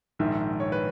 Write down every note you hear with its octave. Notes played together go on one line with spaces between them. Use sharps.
A#1 G#2 D#3 E5
C#5
B4